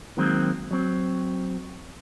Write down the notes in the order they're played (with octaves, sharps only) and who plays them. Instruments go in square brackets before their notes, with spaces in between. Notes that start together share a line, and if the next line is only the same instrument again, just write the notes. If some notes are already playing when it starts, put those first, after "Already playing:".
[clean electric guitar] D#3 F#3 G#3 A#3 C4
F#3 C4